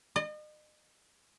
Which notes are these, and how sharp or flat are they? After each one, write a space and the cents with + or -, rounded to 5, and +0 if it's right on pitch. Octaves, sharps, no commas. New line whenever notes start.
D#5 -40